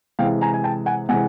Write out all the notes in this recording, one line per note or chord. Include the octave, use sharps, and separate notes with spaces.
C3 E3 G#3 F5 G5
G#5 A#5
G#5
G5 A5
F#5 G#5
C3 E3 G#3 F#5 G#5